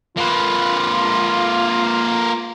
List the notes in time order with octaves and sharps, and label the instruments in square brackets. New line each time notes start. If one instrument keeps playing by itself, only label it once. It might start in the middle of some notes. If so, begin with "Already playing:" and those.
[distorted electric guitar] A#3 B4 [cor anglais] F4